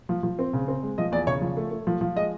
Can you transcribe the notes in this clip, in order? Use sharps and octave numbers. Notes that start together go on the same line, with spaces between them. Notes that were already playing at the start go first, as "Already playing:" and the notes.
F3
F3
C4
C#3
C4
G#3
F3 D#5
E2 D5
C#3 C#5
F3
A3
A3
F3
F3
G#3 D#5